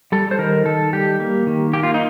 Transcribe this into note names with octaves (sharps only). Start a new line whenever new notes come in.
G3 A4
C5
D#3 A#4
D#3 A4
G3 G4
A#3
D#3
A#3 G4
F4
D#4